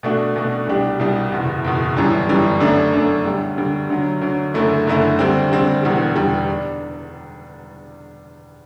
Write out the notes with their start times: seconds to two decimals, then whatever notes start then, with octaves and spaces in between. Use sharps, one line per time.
0.03 B2 A3 D4 F#4
0.36 B2 A3 D4 F#4
0.67 C2 B2 G3 D4 G4
1.00 C2 B2 G3 D4 G4
1.32 F#1 E2 B2
1.65 F#1 E2 B2
1.97 G1 F#2 E3 G3
2.29 G1 F#2 E3 G3
2.60 F#2 D3 A3 D4
2.93 F#2 D3 A3 D4
3.25 D2 D3 G3
3.58 D2 D3 G3
3.90 D2 D3 F#3
4.21 D2 D3 F#3
4.54 F#1 F#2 D3 A3 E4
4.87 F#1 F#2 D3 A3 E4
5.19 D2 D3 G3 C4
5.51 D2 D3 G3 C4
5.83 E1 E2 D3 G3
6.16 E1 E2 D3 G3
6.47 D4